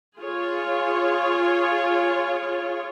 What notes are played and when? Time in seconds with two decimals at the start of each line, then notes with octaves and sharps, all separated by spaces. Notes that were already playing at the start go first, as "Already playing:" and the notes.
0.18 F4 G#4 C#5